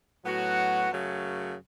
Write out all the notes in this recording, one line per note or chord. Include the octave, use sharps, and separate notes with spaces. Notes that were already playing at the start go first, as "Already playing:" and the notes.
A2 F#3 B3 F#4
F#2 C#3 F#3 A3